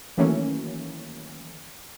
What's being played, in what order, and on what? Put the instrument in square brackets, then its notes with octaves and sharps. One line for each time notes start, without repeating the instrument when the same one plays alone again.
[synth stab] D#3 E3 F#3 A3 A#3 C#4